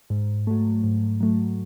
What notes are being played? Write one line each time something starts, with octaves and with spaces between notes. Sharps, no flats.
G#2
F#3 A3
G#2
F#3 A3